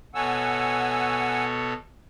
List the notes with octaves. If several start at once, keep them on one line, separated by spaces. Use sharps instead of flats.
B2 A4 C#5 F#5 G#5 E6